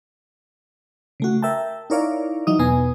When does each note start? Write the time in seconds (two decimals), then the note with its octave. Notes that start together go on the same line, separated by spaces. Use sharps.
1.20 C#3 A3 F#4
1.42 A#4 E5 G5 A5
1.90 D#4 E4 A#4 C#5 D5 F5
2.47 E3 F#3 D#4 D#6
2.59 E2 B2 B3 G#5 D#6